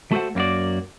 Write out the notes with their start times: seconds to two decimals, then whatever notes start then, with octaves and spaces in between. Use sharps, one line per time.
0.12 A3 F#4 A4 C5 F#5
0.35 F#2 A#3 D#4 F#4 D5